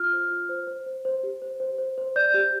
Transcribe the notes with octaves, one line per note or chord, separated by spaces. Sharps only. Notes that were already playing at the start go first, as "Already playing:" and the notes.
Already playing: F4 F6
C5
F4
C5
C5
C5
C5
G4
C5
C5
C5
C5
D5 G6
G4